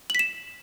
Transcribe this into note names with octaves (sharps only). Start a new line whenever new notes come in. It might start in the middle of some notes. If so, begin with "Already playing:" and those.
B6 E7 F#7